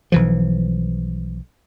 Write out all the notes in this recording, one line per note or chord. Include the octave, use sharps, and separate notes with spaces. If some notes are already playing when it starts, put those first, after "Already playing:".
B1 E3 F3